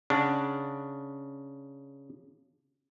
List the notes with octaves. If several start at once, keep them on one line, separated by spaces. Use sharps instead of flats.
C#3 D4 F#5